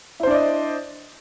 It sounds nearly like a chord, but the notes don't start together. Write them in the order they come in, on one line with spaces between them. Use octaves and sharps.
E4 C5 D4 D5 D#5